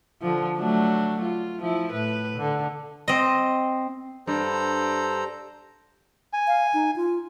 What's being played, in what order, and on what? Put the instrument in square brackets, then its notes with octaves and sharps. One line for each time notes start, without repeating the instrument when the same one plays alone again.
[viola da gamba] D3 F3
F#3 A3 D4
F4
F3 E4
A2 B4
D3
[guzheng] C4 D#5
[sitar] G2 [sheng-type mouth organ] A4 C5 A#5
[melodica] G#5
[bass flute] F5
D#4
F4